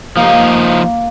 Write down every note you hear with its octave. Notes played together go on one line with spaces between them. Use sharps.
F3 A#3 D#4